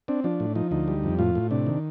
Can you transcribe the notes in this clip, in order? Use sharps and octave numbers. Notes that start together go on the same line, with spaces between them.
C4 D4
F3 D4
A2
F3 D#4
D2 D#4
G3
F2
A2 F4
A2
C3 D4
D#3